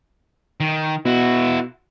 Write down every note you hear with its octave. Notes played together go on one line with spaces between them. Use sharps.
D#3
B2 E4 F#4